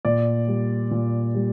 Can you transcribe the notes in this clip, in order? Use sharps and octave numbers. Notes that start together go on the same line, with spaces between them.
A#2 D5
G3
A#2
G3